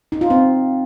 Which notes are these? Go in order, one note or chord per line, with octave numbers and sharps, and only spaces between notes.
D#4
F4
C4